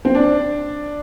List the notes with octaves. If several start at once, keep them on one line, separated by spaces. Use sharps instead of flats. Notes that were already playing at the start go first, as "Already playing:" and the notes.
C4
D4